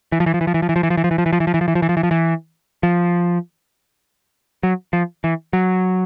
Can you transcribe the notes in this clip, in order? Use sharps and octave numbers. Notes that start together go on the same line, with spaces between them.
E3
F3
E3
F3
E3
F3
E3
F3
E3
F3
E3
F3
E3
F3
E3
F3
E3
F3
E3
F3
E3
F3
E3
F3
E3
F3
E3
F3
E3
F3
F#3
F3
E3
F#3